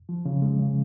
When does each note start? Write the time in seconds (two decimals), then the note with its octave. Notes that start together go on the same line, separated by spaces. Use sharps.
0.09 F3
0.25 C#3
0.42 G#3
0.60 C#3